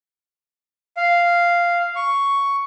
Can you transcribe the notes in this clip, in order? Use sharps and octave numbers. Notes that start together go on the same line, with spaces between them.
F5
C#6